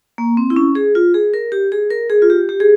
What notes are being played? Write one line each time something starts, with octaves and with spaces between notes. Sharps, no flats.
A#3
C4
E4
C#4
G#4
F4
G#4
A#4
G4
G#4
A#4
G#4
F4
G4
G4
G#4